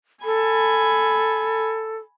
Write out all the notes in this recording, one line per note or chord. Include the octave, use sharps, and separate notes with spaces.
A4 G#5 B5